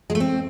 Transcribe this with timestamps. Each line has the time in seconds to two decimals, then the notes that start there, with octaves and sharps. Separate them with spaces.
0.10 G#3
0.15 A3
0.20 C4